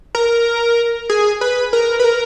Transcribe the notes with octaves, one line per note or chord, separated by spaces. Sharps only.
A#4
G#4
B4
A#4
B4
A#4